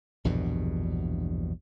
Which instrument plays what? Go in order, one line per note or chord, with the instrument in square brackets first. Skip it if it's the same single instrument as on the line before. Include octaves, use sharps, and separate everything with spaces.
[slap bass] A#1 E2 G2 B2